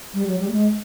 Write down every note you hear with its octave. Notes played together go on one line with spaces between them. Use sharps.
G3
F#3
G3
A3
G#3